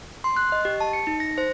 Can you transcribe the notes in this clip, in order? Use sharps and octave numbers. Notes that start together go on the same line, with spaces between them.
C6
F#6
D#5
G4
A5
C#7
D#4
A#6
C5